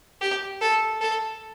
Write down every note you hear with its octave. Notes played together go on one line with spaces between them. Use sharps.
G4
A4
A4